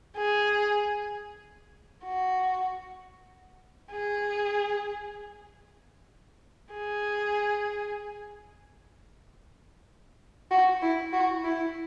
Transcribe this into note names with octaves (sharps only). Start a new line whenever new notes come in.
G#4
F#4
G#4
G#4
F#4
E4
F#4
E4